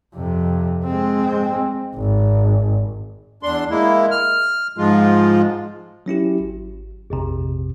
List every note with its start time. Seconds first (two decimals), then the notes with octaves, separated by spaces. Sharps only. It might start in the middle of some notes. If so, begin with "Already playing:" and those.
0.15 F2 C3
0.85 G#3 C4
1.95 G#1
3.43 E2 D4 C6
3.70 G#3 A#3 E4
4.11 F6
4.78 G#2 F3 G#3 F4
6.06 F#3 C#4 E4 G4
6.40 G#1
7.10 A#1 F2 C3